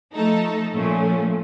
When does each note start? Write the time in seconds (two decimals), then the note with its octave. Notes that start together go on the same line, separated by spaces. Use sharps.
0.14 F3 A3 D#4 A4
0.74 A#2 F3 A3 C#4